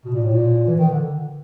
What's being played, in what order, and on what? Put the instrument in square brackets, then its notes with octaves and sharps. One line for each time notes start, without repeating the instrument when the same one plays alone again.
[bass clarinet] B2
A#2
A2
A#2
E3
D#3
D3